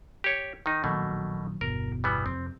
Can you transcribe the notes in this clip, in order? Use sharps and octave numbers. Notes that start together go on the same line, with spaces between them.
G4 C#5
D#3 D#4
A#1 B2 D#3 F#3 A3 A#3
G1 E2 B2 A#4
E3 G3 B3
F2 C3 C4